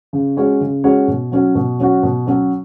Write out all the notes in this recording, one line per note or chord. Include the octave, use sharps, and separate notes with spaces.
C#3
G#3 C#4 F#4 C#5
C#3
G#3 C#4 F#4 C#5
B2
F#3 C#4 F#4
B2
F#3 C#4 F#4
B2
F#3 C#4 F#4